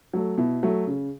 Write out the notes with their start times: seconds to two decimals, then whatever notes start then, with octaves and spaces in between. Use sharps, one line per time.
0.13 F#3 A3
0.38 B2 E4
0.63 F#3 A3
0.87 C#3